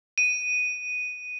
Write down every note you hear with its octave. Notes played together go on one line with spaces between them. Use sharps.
D#7